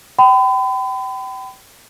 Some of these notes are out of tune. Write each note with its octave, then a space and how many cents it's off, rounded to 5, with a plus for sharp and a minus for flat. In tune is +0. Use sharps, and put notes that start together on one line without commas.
G5 -30 B5 +40